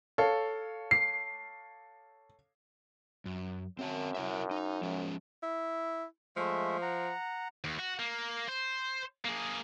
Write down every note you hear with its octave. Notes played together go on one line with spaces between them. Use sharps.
A4 C#5 F5
C7
F#2
F#2 C4 A#4 A5
E4 A#4 E5
D#4
F3 G#3 C#4
E4
F3 G#3 A3 E5
F#5 A#5
D#2
F#4
A#3
C5
A#3 G#4